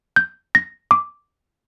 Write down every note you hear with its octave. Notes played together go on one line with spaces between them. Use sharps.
G6
A#6
D6